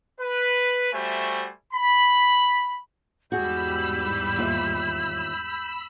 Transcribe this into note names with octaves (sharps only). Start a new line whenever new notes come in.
B4
G3 A3 F#4 C5 E5 G#5
B5
E2 G#2 G3 F#4 G#4 B5 E6 G6
D#2 F4 E5